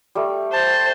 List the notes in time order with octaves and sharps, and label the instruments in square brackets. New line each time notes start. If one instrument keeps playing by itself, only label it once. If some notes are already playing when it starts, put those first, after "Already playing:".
[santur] G3 A3
[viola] C5 [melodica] A5